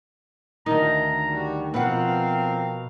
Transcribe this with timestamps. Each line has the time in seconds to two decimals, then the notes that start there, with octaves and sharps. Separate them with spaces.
0.66 D2 D#3 D#4 A#5
1.28 G3 F#4
1.74 B2 F3 C4 A#4 B4 F5 F#5